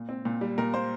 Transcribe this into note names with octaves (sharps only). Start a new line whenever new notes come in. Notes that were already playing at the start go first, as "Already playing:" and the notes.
Already playing: A#2
C4
A#2
G3
A#2 A#4
A#3 C5